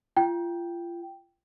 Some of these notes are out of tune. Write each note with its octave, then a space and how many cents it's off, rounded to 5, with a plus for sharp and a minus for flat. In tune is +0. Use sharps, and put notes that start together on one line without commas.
F4 -30 G5 +0